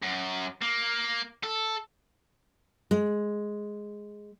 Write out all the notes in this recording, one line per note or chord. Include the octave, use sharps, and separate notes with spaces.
F#2
A#3
A4
G#3